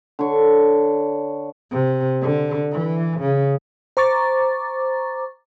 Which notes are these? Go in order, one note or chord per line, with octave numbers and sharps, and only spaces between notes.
D3 C#5
C3
D3
E3
C#3
C5 A#5 C#6 D6 A6